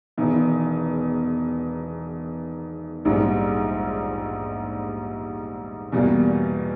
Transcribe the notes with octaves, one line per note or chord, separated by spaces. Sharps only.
E1 E2 D#3
A#1 G#2 G3
E2 B2 G3 A#3